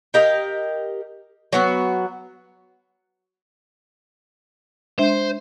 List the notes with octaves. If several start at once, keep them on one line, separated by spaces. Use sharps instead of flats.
G4 A#4 D#5 F5
F#3 B3 F#4
G#3 D4 C5 E5